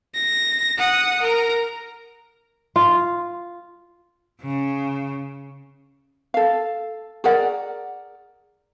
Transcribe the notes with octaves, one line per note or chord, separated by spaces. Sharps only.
A#6
F#5 D#6
A#4 A#5
F4
C#3
A4 F5
G#4 A#4 D5 F#5